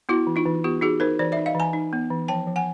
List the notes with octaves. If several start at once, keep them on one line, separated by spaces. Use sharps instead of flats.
B3 E4 F#4
E3
D#4 F4
E3
B3 F4 G4
D#4 F#4 G#4
D#4 A#4 C5
E3 C5 D5
D#4 D5 E5
D#5 F5
E3 G#5 A#5
D#4
B3
E3
F3 G5 A5
F3
F#5 G#5